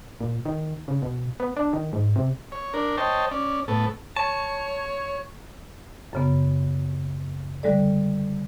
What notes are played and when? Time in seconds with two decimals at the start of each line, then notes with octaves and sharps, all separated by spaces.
0.21 A#2
0.45 D#3
0.88 C#3
1.02 B2
1.40 B3
1.57 D4
1.73 D#3
1.93 G#2
2.16 C3
2.52 C#5
2.74 D4 A#4
2.97 C5 C#5 D#5 G5 A5
3.31 C#4 D5
3.68 A2 B3 A4
4.16 C#5 A5 C#6
6.13 F#2 C#3 B3
7.63 D3 G3 G#3 A4 D5